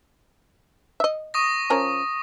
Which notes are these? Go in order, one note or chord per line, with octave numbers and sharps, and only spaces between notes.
D#5 E5
C#6 D#6 A#6
F3 C#4 A#4